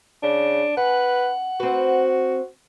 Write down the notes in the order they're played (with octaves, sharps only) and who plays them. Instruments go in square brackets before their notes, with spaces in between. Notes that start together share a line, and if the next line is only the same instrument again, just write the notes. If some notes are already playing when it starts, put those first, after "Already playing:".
[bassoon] C#3 [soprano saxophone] D4
[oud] C#4 [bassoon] B4 [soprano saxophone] F#5
[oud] C4 B4 [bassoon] F#4